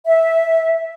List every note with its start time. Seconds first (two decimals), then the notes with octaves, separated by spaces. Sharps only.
0.04 E5